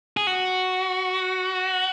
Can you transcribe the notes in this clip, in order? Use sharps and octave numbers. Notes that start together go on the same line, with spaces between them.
G#4
F#4